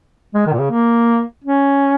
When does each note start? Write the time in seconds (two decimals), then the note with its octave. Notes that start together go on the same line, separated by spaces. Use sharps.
0.35 G#3
0.47 D#3
0.53 A#2
0.59 C#3
0.71 A#3
1.44 C#4